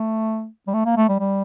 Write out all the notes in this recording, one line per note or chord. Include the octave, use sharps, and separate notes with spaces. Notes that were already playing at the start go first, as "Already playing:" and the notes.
Already playing: A3
G3
A3
A#3
A3
G3
G3